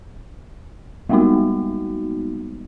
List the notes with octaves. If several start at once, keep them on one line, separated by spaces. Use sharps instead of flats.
G3 G#3 A#3 B3 D#4 F#4